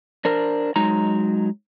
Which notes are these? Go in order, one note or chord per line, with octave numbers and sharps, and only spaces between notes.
D4 A#4 C5
F#3 G#3 D#4 A#5